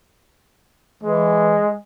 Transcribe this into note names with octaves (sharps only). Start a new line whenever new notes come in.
E3 G#3